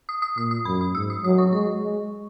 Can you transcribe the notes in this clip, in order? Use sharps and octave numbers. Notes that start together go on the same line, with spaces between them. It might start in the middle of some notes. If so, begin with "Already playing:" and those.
D#6
D#6
A#2 D#6
D#6
F#2 B5
D#6
G#2 E6
D#6
F#3 D#6
C#6
G#3 C#6
G#3